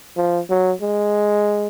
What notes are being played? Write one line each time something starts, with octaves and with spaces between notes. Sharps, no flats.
F3
F#3
G#3